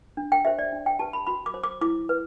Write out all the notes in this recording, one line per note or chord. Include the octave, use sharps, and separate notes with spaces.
D4
G5
G4 C5 E5
D5
D4
G5
G4 B4 A5
B5
F#4 B5
D6
C5
D6
E4 D6
B4